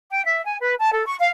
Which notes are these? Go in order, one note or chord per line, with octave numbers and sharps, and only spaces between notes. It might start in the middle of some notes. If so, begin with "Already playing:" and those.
G5
E5
G#5
B4
A5
A4
C#6
F5